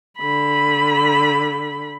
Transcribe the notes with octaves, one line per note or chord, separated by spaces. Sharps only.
D3 B5